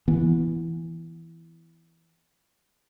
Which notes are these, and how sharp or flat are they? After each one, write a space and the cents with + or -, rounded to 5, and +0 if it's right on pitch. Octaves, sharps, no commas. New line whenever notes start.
E3 +0 B3 -15